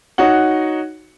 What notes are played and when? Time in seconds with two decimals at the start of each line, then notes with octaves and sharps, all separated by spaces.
0.18 D#4 F#4 C#5 F#5